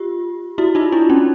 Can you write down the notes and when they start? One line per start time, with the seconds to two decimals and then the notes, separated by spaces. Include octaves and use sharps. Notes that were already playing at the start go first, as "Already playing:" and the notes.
Already playing: F4 G4
0.58 E4 F#4
0.75 D#4 F4
0.92 D4 E4
1.09 C#4 D#4